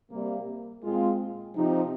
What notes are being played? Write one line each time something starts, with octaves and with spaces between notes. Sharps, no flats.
C3 G3 A#3
A#2 G#3 C4 F4
C3 F3 C4 D#4